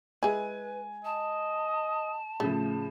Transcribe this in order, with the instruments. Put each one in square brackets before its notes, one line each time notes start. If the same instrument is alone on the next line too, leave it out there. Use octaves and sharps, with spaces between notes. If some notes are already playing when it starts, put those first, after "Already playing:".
[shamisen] G#3 E4 [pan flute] B4 [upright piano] G#5
[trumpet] D#5 [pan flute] A5
[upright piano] A2 C#3 F3 [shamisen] A3